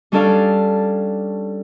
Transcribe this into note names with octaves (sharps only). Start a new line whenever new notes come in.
G3 C#4 D4 A4 D5 F5